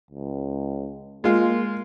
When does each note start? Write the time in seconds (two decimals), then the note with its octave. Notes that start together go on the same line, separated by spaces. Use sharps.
0.11 C#2
1.24 G#3 A#3 F4